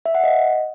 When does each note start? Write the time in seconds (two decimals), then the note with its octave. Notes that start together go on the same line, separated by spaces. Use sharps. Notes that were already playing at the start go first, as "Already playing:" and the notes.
0.06 E5
0.15 F#5
0.24 D#5